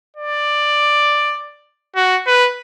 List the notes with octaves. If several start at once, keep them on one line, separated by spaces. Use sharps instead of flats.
D5
F#4
B4